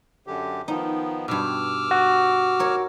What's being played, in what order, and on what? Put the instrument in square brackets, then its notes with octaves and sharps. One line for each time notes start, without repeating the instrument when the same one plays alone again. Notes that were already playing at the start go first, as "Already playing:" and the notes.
[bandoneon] F#2 D3 G4
[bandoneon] D#3 F3 B3 [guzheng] D#4
[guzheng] G2 B2 [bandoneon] D6 E6 F6
[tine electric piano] F#4
[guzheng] A#4 C#5